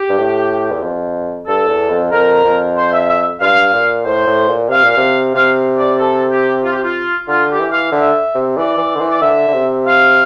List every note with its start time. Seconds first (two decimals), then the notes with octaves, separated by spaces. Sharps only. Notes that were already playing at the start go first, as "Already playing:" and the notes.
Already playing: G4
0.10 G2
0.18 A2
0.71 E2
0.83 F2
1.47 G2 A4
1.68 E2
1.90 F2
2.11 F2 A#4
2.44 F2
2.76 C5
2.92 E5
3.08 E5
3.41 G2 F5
3.73 A#2
4.05 A2 C5
4.27 A2
4.48 A#2
4.69 C3 F5
4.84 A#2
4.97 C3
5.34 C3 F5
5.77 D5
5.98 A4
6.31 G4
6.63 F4
6.72 G4
6.82 F4
7.28 D3 F4
7.50 G4
7.60 E3
7.71 F5
7.92 D3 E5
8.35 C3
8.57 E3 D5
8.78 E3
8.95 D3 C5
9.00 E3
9.09 D5
9.21 D3 E5
9.48 D3
9.54 C3
9.86 F5